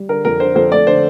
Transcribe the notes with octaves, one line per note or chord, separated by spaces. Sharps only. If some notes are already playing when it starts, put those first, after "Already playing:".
Already playing: G3
D3 A#4
F2 A#4
D3 C5
F2 C5
A3 D5
D3 C5